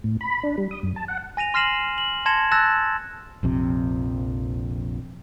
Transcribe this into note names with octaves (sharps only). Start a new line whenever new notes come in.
A2
B5
D4
G3
D#6
F#2
A5
F#5
G#5 A#6 D#7 F7
C6 F6 A#6 C7 E7 F#7
F#7
A5 C6 G#6 A#6 C#7 E7
A5 E6 F#6 A6 A#6 E7
A#1 F2 C3